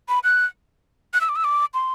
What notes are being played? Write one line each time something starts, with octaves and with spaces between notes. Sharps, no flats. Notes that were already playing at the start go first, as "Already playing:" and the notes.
B5
F#6
F#6
E6
D6
E6
D6
C6